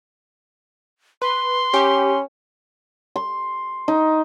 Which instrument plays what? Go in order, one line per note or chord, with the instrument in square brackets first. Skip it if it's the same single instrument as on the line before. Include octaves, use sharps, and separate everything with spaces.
[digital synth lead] B4 [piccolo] C6
[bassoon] C#4 [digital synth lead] G4
[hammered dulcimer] C6
D#4